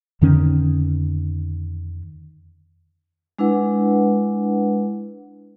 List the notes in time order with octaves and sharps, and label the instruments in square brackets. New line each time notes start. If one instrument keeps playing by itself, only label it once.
[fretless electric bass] F2 D3 D#3 C#4
[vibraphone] G#3 D4 E4 B4 F#5